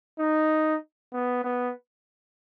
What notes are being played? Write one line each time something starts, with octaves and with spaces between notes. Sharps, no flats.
D#4
B3
B3